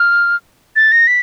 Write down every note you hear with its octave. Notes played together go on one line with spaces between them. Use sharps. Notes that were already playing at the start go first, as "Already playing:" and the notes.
Already playing: F6
A6
A#6
B6